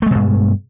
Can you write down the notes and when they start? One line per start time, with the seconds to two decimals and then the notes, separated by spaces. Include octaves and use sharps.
0.02 A3
0.06 G#3
0.11 B2
0.15 G2